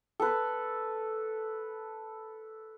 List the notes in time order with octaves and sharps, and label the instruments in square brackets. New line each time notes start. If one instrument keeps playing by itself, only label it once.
[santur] A4 B4